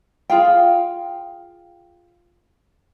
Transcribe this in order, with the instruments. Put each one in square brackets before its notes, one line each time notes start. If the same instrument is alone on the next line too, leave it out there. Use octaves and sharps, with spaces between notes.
[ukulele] F4 G#4 F5 G5